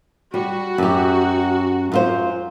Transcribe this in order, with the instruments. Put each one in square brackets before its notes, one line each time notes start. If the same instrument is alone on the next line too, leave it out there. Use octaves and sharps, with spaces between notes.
[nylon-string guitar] G3 [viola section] F#4
[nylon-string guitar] F#2 G4
F#2 F4 C5